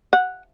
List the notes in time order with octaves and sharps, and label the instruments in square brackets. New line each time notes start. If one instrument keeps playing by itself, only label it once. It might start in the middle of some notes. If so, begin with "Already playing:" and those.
[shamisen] F#5